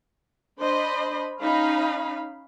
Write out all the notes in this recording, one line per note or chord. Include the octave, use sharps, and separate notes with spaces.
D4 C5 D#5 B5
C#4 D#4 F5 B5